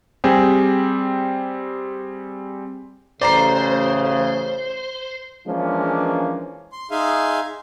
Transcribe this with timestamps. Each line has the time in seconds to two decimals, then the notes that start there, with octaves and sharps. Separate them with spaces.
0.24 G3 C4 G4 G#4
3.21 A1 C#3 C5 D5 A#5 C7
5.48 E3 F3 G#3 A#3 C#4 D4
6.72 C6
6.91 D#4 G#4 E5 F5 G#5 C6